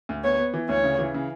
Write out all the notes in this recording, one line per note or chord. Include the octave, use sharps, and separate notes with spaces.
D2
B3 C#5
B3
E3
D2 C#5
C#3
E3
C#3